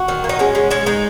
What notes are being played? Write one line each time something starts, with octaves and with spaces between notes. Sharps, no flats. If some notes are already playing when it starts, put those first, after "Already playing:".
Already playing: F#4
D#3
A#3
D#4
G#3 C#4
G#3
G#3 C#4
G#3 D#4